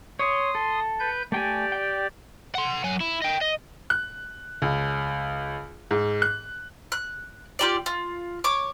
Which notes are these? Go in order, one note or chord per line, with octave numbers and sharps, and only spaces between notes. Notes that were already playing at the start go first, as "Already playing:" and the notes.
C#5 C6 D#6
A4
B4 G6
A3 G4 D5 G5 G#5
G5
F#5 C6
F#3 G#5
E4
D#5 G5
D#5
F#6
C#2
G#2
F#6
F#6
F4 G4 D5
F4
C#5 D6